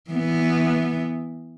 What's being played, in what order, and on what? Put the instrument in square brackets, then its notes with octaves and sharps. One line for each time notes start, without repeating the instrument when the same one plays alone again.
[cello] E3 B3